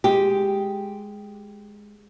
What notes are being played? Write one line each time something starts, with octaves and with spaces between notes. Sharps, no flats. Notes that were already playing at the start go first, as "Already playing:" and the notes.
G#3 G4